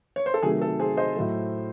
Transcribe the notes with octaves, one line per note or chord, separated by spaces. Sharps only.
C#5
C5
A4
C3 D#3 F#3 A3 G#4
A4
G#4 C5
C5 D#5
A2 F#3 A3